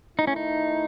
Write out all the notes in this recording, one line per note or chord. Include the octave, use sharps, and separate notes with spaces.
D#3 A3 D#4 E4
C#4
D#4